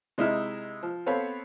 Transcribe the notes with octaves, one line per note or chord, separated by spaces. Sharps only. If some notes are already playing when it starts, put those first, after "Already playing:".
C3 G#3 D#4 E4 E5 F6
F3
B3 C4 A4 C#5 F5 B5